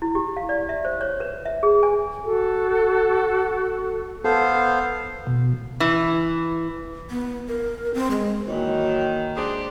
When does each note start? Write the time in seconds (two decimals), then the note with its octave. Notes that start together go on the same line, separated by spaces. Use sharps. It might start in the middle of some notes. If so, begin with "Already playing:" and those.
0.02 E4
0.15 G4
0.37 F5
0.49 D5
0.69 E5
0.85 C5
1.01 C#5
1.20 B4
1.45 E5
1.63 G#4
1.83 G#5
2.24 F#4 A4
4.25 B3 A4 C5 F5
5.27 B2
5.80 E3
7.10 B3
7.48 A#4
7.94 C4
8.11 G#3
8.48 A#2 D#3 E3 F#3
9.36 G#3 D4 G4 C5